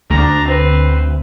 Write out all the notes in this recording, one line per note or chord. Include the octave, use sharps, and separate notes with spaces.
D2 D4 A#5
C4 B4